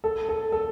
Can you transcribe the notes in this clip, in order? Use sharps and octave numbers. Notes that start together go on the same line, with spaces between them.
A4
A4
A4